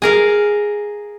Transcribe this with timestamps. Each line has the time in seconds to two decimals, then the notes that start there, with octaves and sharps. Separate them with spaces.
0.02 G#4 A#4 F5